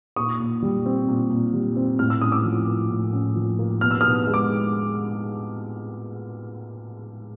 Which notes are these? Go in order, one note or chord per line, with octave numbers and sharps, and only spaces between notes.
A#2 C#6 D#6
A#2
G3
C4
A#2
A#2
G3
C4
A2 F6
E6
C#4 D#6
D6 E6
F3
A#3
A2
C#4
F3
A#3
B2 F6
E6
B2 D#6 F6
G#3
D6